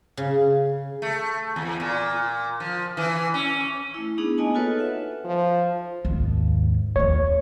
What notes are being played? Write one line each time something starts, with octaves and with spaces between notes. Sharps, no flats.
C#3
A3
E2
A#2
F3
E3
C#4
A3 E4
B3 D4 D#4 G#4
A#3 B3 D#4 D#5 G#5 A5
F4 F#4 A4 B4 C#5
E5 F#5
F3
D#2 G#2
D#2 A3 C#5